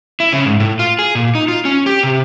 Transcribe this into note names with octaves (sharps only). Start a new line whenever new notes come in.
E4
C#3
G#2
A2
F4
G#4
A#2
D#4
F4
C#4
G4
C3